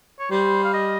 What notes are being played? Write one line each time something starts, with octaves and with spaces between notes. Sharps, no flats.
C#5
G3 C5
F5
D#5